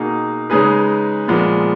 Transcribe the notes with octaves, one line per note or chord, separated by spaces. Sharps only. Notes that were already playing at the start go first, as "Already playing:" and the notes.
Already playing: B2 A#3 D#4 G#4
C#3 G#3 D#4 G#4 B4
A#2 F3 G#3 B3